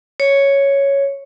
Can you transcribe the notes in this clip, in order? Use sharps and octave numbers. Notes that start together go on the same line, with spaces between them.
C#5